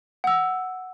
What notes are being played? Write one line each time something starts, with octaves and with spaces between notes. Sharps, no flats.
F#5 E6